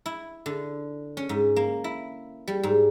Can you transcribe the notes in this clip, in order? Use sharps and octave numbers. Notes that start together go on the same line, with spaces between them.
E4
D3
C#4
G#2
A#3
E4
G3
G#2